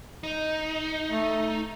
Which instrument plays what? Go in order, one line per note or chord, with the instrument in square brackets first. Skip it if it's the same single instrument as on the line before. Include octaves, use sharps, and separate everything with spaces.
[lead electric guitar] D#4
[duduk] A3